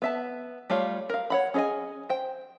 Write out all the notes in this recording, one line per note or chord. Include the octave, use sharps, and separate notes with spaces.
B3 E5 A5
G3 A3 F4 C#5 F5
A#4 F5
C#5 F#5 B5
C#4 G#4 D5 D#5 G#5
C5 G5